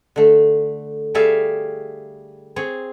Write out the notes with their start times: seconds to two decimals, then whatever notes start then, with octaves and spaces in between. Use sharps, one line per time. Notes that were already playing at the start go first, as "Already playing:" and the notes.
0.16 D3 A3
1.15 G3 A3 G#4 A4 E5 F5
2.56 C4 G#4 C#5